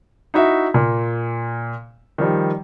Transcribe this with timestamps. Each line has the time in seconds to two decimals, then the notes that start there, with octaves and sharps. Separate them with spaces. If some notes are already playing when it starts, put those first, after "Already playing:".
0.34 D#4 E4 F#4 E5
0.74 A#2
2.18 D#3 F3 G3